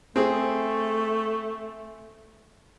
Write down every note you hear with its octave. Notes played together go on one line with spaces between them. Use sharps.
A3 C4 G#4